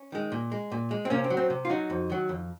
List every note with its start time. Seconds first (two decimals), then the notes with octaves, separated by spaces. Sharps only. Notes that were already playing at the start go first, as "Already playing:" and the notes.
Already playing: C#4
0.12 D#3 G#3
0.32 A#2
0.52 G#3
0.72 A#2
0.91 G#3
1.05 C4
1.10 C3 A#3 C#4
1.24 C4
1.30 F#3
1.37 C4
1.50 C3
1.65 F4
1.70 F#3 D#4 F#4
1.90 F2
2.10 D#3 F#3
2.29 F2